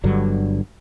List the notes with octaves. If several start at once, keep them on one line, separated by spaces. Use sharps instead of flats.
G1 G2 D3 F#3